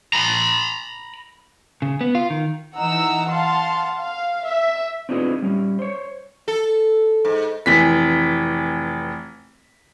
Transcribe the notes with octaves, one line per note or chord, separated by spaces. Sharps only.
A#5 B5
C#3
B3
F4
D#3
E3 D#4 F#5 A#5 E6
F5 F#5 A5 C6
F5
E5
C4 D4 D#4 F4 G#4 B4
G3 C#4
C5 C#5
A4
G#2
F1 E3 B6